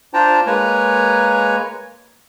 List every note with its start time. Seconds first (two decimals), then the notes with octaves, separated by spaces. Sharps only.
0.14 D4 F4 C5 G5 A5 A#5
0.46 G#3 A#3 B4 C#5 G#5 A#5